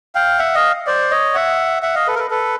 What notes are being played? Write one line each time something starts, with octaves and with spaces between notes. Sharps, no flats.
F5 G5
E5 F#5
D#5 F5
C5 D5
C#5 D#5
E5 F#5
E5 F#5
D#5 F5
A4 B4
A#4
A4 B4
A4 B4